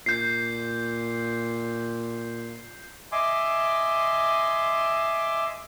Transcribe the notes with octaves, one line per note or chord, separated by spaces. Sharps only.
A#2 G6 C7
D#5 E5 G#5 C6 D6